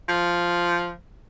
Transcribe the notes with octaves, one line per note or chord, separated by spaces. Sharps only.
F3